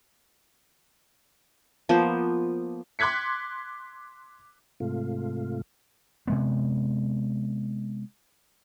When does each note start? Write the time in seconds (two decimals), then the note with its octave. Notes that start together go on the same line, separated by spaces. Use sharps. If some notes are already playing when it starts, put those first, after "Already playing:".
1.89 F3 A#3 B3 C5
2.99 C6 D6 F#6 G#6 B6 C#7
4.80 G#2 C3 A3 F4
6.27 C3 G#3 B3